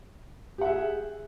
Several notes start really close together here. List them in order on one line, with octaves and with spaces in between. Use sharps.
G4 F#5 E5 G#4